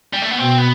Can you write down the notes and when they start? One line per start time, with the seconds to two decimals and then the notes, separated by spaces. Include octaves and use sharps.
0.13 G3
0.22 A3
0.31 B3
0.38 B2 C4
0.58 B3